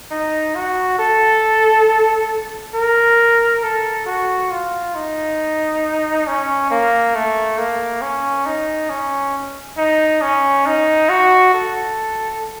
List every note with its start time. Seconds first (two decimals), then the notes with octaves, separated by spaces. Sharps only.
0.11 D#4
0.55 F#4
0.99 A4
2.75 A#4
3.63 A4
4.06 F#4
4.51 F4
4.95 D#4
6.27 C#4
6.71 A#3
7.15 A3
7.58 A#3
8.02 C#4
8.46 D#4
8.90 C#4
9.78 D#4
10.22 C#4
10.66 D#4
11.09 F#4
11.54 A4